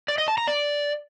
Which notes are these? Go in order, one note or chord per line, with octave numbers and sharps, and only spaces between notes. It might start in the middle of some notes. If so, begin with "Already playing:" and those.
D5
D#5
A5
A#5
D5